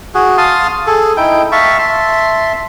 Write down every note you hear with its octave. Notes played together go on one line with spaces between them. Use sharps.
F#4 G#4
F5 A5 C6 D#6
G#4 A4
D#4 E4 G5
E5 F5 A5 C#6
E5 A5 C6